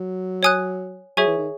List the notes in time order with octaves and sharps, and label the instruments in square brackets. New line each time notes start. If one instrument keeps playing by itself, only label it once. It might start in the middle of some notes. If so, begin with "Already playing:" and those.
Already playing: [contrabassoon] F#3
[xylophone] C#5 G#5 D#6 F#6
[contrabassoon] F#3 [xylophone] G#4 C#5 E5 G#5 C#6
[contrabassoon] E3
D#3